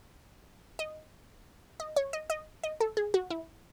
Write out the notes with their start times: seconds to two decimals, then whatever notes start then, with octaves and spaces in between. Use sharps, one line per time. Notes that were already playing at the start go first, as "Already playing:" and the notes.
0.79 D#5
1.80 D#5
1.96 C#5
2.13 D#5
2.30 D#5
2.64 D#5
2.80 A4
2.97 G#4
3.14 F#4
3.30 E4